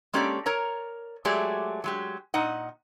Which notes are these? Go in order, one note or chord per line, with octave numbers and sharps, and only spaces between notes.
G#3 A#3 C#4 G4 A4 D5
A#4 C#5 A#5
F#3 G#3 A3 G4 G#4 D5
F#3 G#3 G4
A#2 D#4 D#5 F#5